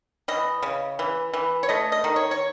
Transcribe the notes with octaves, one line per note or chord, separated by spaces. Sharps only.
E3 D#5
C#3
E3
E3
C#5
A3 D#5
D#5
D#3
C#5
C#5